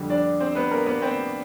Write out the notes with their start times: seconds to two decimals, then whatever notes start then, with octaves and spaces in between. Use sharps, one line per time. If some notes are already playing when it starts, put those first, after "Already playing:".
Already playing: F2 D3 G3
0.10 D4 D5
0.40 C4 C5
0.55 B3 B4
0.71 A#3 A#4
0.86 B3 B4
1.02 C4 C5